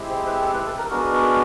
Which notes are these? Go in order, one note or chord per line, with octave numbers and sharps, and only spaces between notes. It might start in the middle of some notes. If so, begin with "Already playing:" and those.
Already playing: G#3 C4 E4 G4
C5
B4
A4
B4
A4
A#4
G#3 B3 D4 F#4 A#4
A#4